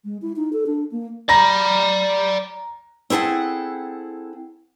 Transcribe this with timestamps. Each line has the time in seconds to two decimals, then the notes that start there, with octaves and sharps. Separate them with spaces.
0.05 G#3
0.22 E4
0.36 D#4
0.53 A4
0.67 D4
0.92 A#3
1.29 D5 A#5 B5 A#6
3.10 C4 E4 G#4 A4 F#5